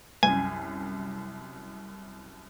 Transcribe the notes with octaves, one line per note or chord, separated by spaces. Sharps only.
C2 F#2 G#5